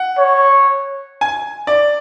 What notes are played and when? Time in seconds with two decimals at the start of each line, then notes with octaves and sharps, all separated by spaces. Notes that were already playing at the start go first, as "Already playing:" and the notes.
Already playing: F#5
0.18 C#5
1.21 G#5
1.67 D5